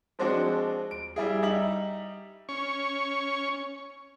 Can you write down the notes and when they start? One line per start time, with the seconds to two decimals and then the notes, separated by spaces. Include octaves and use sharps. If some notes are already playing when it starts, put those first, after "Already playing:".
0.19 F3 G#3 C4 D4 F#4
0.91 D7
1.16 G3 E4 G#4
1.43 G3 D#4 E5 F#7
2.49 C#4 C#6